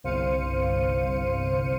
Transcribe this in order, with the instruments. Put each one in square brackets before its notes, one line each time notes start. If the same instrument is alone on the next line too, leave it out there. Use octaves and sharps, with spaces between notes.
[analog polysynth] G1 C2 C5 F5 C#7 D#7